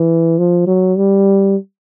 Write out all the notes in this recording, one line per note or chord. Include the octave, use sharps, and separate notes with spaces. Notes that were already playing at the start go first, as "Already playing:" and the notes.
Already playing: E3
F3
F#3
G3